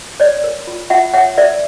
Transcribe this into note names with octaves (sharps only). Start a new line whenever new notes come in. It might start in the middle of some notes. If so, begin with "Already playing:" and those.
C#5 D5
A#4
F4
F4 E5 F#5
C#5 E5 F#5
A#4 D5 E5